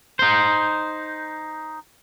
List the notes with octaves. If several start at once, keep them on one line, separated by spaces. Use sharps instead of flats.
D#4 C5